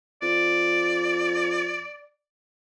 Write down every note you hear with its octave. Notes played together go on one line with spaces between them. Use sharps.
F2 D5